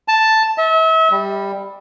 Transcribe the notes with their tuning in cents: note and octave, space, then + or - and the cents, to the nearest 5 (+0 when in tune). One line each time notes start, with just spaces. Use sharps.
A5 +0
E5 -35
G3 +10